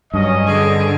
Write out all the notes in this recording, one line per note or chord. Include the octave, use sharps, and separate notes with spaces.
G2 F#3 C#4 D#5
D3 G#4